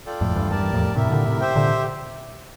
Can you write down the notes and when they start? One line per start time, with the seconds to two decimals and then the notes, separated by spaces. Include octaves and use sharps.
0.06 F4 A4 D5 G5
0.21 F2 A2
0.36 E2 G2
0.51 E2 G2 G4 A#4 D5 A5
0.73 F2 A2
0.95 A2 C3 E4 G4 A#4 E5
1.11 A#2 D3
1.25 A2 C3
1.41 G4 C5 E5 G5
1.55 A#2 D3